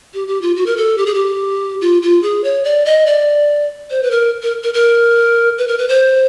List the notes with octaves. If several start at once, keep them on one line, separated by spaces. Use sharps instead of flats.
G4
G4
F4
F#4
A#4
A4
G4
G#4
G4
F4
F4
G#4
C#5
D5
D#5
D5
C5
B4
A#4
A#4
A#4
A#4
B4
A#4
B4
C5